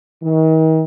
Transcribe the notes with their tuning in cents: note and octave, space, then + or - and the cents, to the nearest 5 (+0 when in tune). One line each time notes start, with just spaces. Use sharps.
D#3 +40